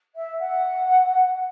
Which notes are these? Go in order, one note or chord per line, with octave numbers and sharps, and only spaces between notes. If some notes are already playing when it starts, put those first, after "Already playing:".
E5
F#5